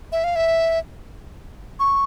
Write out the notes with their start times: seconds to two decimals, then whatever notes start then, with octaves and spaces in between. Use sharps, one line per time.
0.12 E5
0.24 F5
0.36 E5
1.80 C#6